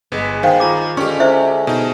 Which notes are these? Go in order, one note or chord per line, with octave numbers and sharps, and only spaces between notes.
G1 G#3 B3
D#3 C5 F5 G5
F4 A#5 D6
D3 G#3 C#4 G4 C#6
E4 C5 E5
B2 D#4